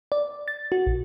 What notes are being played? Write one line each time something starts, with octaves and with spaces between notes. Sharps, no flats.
D5
A6
F#4
A#1